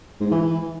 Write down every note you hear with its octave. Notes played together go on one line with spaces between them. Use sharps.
G#2
E3
E3